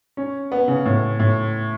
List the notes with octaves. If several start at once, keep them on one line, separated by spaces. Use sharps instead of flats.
C#4
B3
C#3
A2
A2